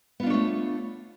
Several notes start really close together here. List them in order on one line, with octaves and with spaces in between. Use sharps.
B3 F4 D4 C#5 A3